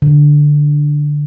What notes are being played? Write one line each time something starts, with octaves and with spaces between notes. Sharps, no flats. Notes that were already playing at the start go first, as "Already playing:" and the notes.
D3